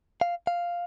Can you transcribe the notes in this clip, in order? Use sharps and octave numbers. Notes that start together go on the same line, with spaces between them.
F5
F5